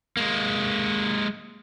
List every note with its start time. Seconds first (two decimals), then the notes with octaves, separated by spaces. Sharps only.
0.17 G#3 A#3